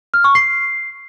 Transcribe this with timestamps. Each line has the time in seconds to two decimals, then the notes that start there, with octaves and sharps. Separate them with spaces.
0.14 F6
0.24 C#6
0.35 C7